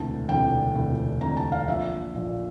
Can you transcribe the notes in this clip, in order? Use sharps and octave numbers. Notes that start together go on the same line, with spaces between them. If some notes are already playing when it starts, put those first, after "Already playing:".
Already playing: E1 D2 C3 E3 A3 A5
E1 D2 C3 E3 A3 G5
E1 D2 C3 E3 A3
E1 D2 C3 E3 A3 A#5
A5
F5
A#1 A#2 F3 E5
A#1 A#2 F3